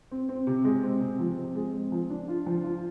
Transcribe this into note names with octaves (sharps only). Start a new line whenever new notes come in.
C4
C4
C3
G#3
C4
C3
F3
C4
G#3
C4
F3
D4
F4
F3
F4